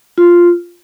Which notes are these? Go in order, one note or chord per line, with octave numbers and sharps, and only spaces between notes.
F4